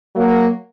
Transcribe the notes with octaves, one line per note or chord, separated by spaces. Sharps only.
F#3 A#3